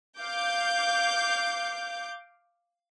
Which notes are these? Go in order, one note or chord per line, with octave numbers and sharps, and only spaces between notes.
F5 D6 G6